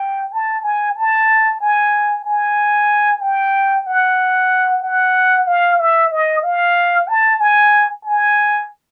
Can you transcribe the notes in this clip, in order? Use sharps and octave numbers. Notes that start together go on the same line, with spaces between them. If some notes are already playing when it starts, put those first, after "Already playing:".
Already playing: G5
A5
G#5
A5
G#5
G#5
G5
F#5
F#5
F5
E5
D#5
F5
A5
G#5
G#5